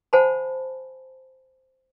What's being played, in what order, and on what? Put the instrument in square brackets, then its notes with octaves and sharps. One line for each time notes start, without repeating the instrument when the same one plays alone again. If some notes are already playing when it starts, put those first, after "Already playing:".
[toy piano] C5 F#5 G#5 A5 B5